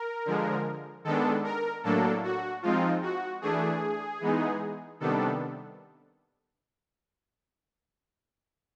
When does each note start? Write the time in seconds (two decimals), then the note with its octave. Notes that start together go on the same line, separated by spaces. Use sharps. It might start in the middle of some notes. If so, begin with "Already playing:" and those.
Already playing: A#4
0.25 D3 F3 G#3
1.04 D#3 G#3 B3 D4 A4
1.44 A#4
1.84 A2 F#3 A#3 D4 A4
2.24 F#4
2.62 F3 G#3 C4 D#4 F4
3.02 F#4
3.41 E3 A3 D4 G#4
4.21 E3 G#3 B3 D#4
5.00 C3 D#3 G3 B3 D4 A4